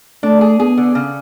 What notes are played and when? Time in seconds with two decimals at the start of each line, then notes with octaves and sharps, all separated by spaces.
0.23 A3 D4
0.41 G#4
0.59 B3 G#4
0.77 D3
0.95 C#3